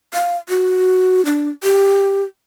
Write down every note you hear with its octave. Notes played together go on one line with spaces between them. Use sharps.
F5
F#4
D4
G4